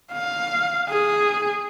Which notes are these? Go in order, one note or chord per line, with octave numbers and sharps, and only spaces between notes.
F5
G#4